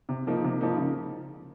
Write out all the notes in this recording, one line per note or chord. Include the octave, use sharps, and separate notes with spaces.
C3
F3 A#3 D#4
C3
F3 A#3 D#4
C#3